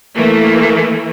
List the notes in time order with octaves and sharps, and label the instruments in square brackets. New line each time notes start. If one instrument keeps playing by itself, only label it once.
[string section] E3 A3 A#3